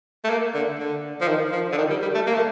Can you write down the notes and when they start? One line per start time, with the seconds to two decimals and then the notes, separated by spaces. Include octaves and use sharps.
0.24 A3
0.30 A#3
0.54 D3
0.79 D3
1.21 F3
1.28 D#3
1.52 F3
1.72 D3
1.78 D#3
1.90 G3
2.02 G3
2.15 A3
2.27 A#3
2.35 A3